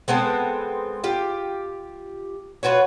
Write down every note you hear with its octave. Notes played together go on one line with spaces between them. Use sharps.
G#3 B3 C4 A4
F4 G4
F4 F#4 B4 C#5